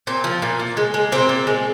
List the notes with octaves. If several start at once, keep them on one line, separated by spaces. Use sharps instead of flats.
A#2 C4
F3
A#2
A#2
G#3
G#3
A#2 C4
A#2
G#3